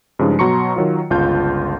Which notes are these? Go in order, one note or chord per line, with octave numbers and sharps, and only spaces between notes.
G2 C#3 F3 G#3 D#4
B2 F#3 A#5 C6 C#6 C#7
D#3 F#3 F4
G1 C#2 F4 A5 G6